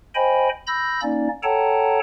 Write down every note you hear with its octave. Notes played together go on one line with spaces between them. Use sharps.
C5 D#5 G5 G#5 B5
B5 E6 G6 A#6
A#3 C#4 D#4 D5
A4 C#5 F#5 G5 A5 A#5